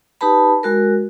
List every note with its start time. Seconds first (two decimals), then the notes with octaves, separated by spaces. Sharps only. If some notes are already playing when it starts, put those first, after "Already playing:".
0.21 D#4 G4 B4 A5 B5
0.63 G#3 F#4 A#4